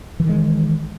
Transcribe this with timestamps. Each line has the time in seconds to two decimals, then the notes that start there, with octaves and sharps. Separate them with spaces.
0.20 E3
0.24 D#3
0.29 G#3